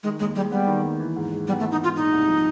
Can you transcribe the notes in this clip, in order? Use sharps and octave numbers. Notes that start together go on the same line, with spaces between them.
D#3 G#3
D#2 G#3
G3 G#3
G3 B3
D#3
D#2
E3
G#2
G#3
G3 B3
A3
E3
D#4
G#2 F4
A#2 D#4
C2
F3